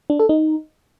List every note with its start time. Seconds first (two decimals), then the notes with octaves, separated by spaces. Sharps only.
0.10 D4
0.20 A4
0.29 D#4